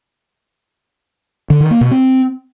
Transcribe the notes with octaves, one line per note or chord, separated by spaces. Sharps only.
D3
D#3
A#3
B2
C4